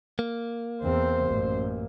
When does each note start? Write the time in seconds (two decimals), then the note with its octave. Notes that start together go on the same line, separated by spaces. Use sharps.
0.19 A#3
0.83 E2 C4 C5
1.27 A1 F#2